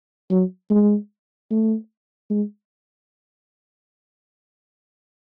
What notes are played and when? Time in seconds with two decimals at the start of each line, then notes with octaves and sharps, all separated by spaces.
0.31 F#3
0.70 G#3
1.51 A3
2.30 G#3